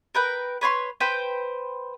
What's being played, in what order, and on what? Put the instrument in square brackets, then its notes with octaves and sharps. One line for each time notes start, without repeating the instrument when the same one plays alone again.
[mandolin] A#4 B4 G5
B4 C#5 B5 C6
B4 C5 G5